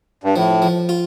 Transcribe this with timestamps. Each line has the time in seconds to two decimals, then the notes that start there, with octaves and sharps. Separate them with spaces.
0.24 G2
0.36 A2 F3
0.62 F3
0.89 F4